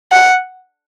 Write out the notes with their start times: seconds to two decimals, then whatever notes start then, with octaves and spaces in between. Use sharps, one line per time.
0.12 F#5